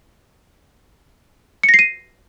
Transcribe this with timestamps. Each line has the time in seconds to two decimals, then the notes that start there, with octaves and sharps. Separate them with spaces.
1.63 C#7
1.69 A#6
1.74 C7
1.79 D#7